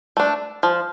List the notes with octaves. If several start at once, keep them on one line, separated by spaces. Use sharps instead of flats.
A3 D4
F3